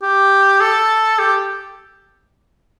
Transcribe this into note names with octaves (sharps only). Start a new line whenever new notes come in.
G4
A4
G4